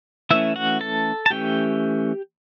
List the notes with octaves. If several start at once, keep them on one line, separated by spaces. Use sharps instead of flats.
E3 A3 C#4 E4 E5
F#4 F#5
A4 A5
A5
E3 A3 C#4 G4 G5